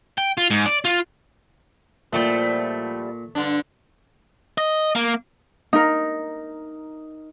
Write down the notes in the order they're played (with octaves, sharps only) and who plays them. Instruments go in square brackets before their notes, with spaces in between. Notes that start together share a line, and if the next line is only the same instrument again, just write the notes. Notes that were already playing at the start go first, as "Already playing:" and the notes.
[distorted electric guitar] G5
F4
G#2
D5
F4
[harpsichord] A#2 [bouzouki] F3 G3 E4 [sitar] A3
[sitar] G2 D3 D4
[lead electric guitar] D#5
A#3
[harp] D#4 A#4